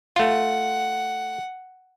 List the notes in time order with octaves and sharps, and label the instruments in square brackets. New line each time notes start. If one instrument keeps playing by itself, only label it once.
[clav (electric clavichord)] A3 F4 [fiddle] F#5